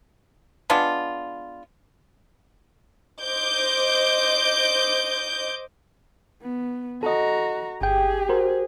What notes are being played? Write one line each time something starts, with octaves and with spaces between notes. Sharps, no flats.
G#3 B3 D4 F4
C5 D#5 D6 G6
B3
F#4 A4 D#5 A#5
G1 G4 G#4 G5
F#4 A#4 C5